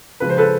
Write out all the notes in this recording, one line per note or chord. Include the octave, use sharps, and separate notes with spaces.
C#3 F3 G#3 B4
C5
A4 B4